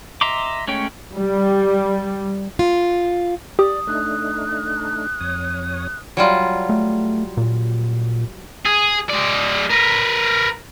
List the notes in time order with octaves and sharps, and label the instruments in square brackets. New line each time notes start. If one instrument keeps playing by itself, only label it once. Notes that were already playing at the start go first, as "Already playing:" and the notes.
[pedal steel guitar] D#5 E5 A#5 C6 D6
G#3 A3 C#4 C#5 G5
[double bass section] G3
[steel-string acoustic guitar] F4
[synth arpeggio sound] G4 [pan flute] D5 [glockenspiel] D#6
[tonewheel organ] A3 D4 D#4 [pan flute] F#6
[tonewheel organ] F2 C#5 D#6
[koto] F#3 G3 F4
[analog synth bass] A3
A#2
[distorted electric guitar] G#4
G#3 D5
A#4 B4